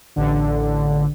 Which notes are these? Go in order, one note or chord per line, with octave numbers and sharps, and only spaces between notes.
A1 D3